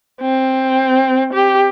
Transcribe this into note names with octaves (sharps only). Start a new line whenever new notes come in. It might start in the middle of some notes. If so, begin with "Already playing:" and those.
C4
G4